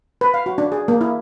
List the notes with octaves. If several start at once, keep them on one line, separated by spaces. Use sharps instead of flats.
B4
F5
F#4
D4
G#4
A#3
E4